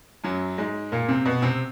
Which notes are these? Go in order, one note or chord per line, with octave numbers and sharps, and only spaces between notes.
F#2 F#3
G#2 G#3
A#2 A#3
C3 C4
B2 B3
C3 C4